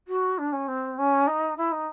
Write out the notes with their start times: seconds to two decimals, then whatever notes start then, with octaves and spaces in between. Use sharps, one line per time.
0.07 F#4
0.38 D4
0.52 C#4
0.68 C4
0.98 C#4
1.27 D#4
1.57 E4
1.72 D#4